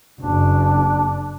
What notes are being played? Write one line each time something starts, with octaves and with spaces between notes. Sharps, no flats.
F#1 D4